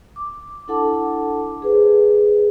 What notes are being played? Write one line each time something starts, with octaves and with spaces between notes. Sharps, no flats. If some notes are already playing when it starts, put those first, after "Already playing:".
D6
D4 E4 A4 F#5 A5 D6
G#4 B4 C5